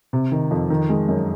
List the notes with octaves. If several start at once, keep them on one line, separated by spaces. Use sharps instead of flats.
C3
D#3
F2
D#3
G#3
F#2